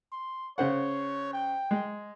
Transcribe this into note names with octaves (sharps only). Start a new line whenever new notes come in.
C6
C#3 C5 C#5 F#5
G5
G#3